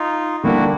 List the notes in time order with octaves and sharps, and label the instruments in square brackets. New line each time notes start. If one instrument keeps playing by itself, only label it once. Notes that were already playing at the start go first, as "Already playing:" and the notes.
Already playing: [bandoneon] D#4 F4
[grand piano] D3 G3 A#3 D4 [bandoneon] E4 F#4